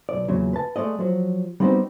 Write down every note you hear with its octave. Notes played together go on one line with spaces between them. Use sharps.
B1 D5
E2 A#2 C#3 F#3
B4 A5
G#3 A3 D5 D#5
F3 F#3
G3 B3 C4 D#4 F#4 G4